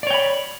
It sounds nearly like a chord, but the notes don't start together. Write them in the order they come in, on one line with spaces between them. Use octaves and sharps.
D5 C#5 G5 B5